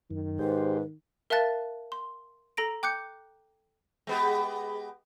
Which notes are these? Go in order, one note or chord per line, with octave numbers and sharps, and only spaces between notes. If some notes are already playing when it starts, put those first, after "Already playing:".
F#2 D#3
G#2 G4 B4 C5
A#4 E5 F5 A5 F#6 A6
C6
A4 A#5 A#6 D7
G5 D6 F#6 G6 C#7
G#3 B3 G4